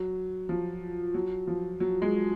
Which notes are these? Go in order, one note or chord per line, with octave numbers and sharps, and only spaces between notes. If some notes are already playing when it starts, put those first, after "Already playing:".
Already playing: F#3
F3
F#3
F3
F#3
G#3